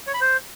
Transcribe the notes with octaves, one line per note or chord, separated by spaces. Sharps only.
C#5
B5
C5